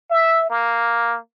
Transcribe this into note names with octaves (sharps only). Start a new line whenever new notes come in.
E5
A#3